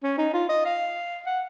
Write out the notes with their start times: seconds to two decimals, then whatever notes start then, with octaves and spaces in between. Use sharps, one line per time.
0.03 C#4
0.18 D#4
0.33 F4
0.49 D#5
0.65 F5
1.26 F#5